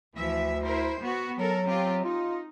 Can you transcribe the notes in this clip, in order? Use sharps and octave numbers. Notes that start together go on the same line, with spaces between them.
D2 E3 F3 E5
E4 A#4 C5
B3 F#4
F#3 A4 A#4
C4 F4 G4
D#4 F4